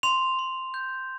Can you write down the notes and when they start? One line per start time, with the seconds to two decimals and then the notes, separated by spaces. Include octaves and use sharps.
0.03 C6 F7
0.39 C6
0.74 G6